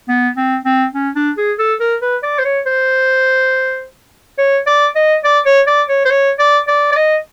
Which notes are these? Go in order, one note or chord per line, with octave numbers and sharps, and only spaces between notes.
B3
C4
C4
C#4
D4
G#4
A4
A#4
B4
D5
C5
C#5
C5
C#5
D5
D#5
D5
C#5
D5
C#5
C5
C#5
D5
D5
D5
D#5